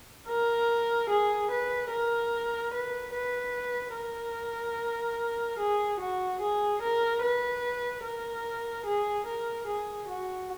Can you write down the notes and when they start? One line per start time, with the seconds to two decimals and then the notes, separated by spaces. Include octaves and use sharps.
0.28 A#4
1.10 G#4
1.51 B4
1.91 A#4
2.74 B4
3.15 B4
3.95 A#4
5.59 G#4
6.00 F#4
6.41 G#4
6.82 A#4
7.23 B4
8.04 A#4
8.86 G#4
9.27 A#4
9.67 G#4
10.08 F#4